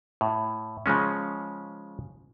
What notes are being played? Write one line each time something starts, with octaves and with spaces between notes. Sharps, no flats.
A2
C#3 F3 G#3 C#4